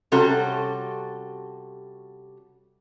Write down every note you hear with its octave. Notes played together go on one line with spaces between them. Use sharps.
C3 G3 C#4 F#4 A4